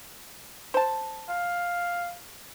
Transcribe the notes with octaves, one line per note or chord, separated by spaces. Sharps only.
C5 A5
F5